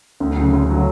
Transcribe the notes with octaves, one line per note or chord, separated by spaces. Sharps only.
D2
C#3 F#3
D2
C#3 F#3